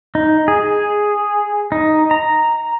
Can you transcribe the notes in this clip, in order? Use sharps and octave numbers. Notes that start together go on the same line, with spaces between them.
D#4
G#4
D#4
A#5